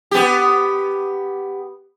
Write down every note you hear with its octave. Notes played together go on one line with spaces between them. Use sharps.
B3 G4